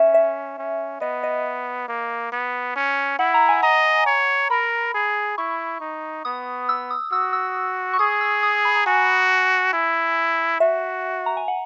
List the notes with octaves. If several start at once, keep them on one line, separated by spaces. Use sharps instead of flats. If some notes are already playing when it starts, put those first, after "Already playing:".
Already playing: C#4 E5
E5
C#4
B3 D#5
D#5
A#3
B3
C#4
E4 F#5
A#5
G#5
D#5 A#5
C#5
A#4 B5
G#4
E4 C#6
D#4
B3 D#6
E6
D#6
F#4 E6
E6
C#6
G#4 D#6
E6
D#6
B5
A#5
F#4 G#5
E4
F#4 E5
A#5
G#5
F#5